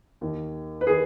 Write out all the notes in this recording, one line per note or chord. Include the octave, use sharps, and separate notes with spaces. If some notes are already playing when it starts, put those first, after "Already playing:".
D#2 D#3
B4
D#3 G#4